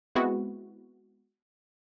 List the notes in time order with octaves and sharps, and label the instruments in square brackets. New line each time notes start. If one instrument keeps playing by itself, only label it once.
[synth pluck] G#3 B3 C4 E4 F#4